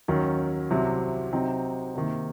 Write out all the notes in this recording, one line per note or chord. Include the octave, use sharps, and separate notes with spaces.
D#2 D#3 F#3 C#4
C2 C3 F#3
C3 F#3 C4 D#4
C3 D#3 A#3